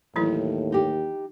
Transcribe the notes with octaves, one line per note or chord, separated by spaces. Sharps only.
D#2 A2 E3 F#3 E4
D#4 G4